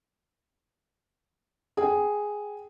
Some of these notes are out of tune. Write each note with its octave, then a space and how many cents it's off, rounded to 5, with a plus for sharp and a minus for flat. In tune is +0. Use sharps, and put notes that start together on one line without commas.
G#4 +0 G5 -15